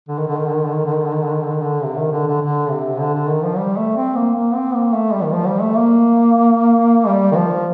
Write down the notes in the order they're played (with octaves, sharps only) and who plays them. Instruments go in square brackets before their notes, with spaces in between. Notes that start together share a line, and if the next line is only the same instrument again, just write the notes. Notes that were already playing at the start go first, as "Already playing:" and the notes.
[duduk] D3
D#3
D3
D#3
D3
D#3
D3
D#3
D3
D#3
D3
D#3
D3
D#3
D3
D#3
D3
C3
D#3
D3
D3
D3
C3
D3
D3
D#3
F3
G3
A3
C4
A#3
A#3
C4
A#3
A3
G3
D#3
F3
G3
A3
A#3
G3
D#3
F3